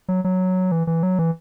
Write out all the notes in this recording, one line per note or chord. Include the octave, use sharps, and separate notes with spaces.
F#3
F#3
E3
E3
F#3
E3